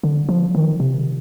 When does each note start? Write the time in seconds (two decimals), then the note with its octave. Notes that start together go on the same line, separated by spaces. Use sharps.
0.03 D3
0.29 F3
0.55 D#3
0.80 C3